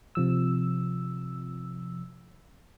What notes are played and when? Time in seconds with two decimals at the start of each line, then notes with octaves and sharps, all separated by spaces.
0.15 C3 F3 E6